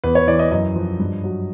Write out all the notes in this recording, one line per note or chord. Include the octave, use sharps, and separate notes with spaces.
E2 B4
C#5
E3 D5
D#5
F#2 D#5
F3
G2
F#3